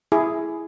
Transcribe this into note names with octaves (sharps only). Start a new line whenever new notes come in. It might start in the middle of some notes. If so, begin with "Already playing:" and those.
E4 G#4